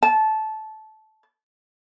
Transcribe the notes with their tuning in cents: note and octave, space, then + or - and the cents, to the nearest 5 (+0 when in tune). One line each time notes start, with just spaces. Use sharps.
A5 -15